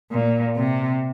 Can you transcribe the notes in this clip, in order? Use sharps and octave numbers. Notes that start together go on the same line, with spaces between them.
A#2
C3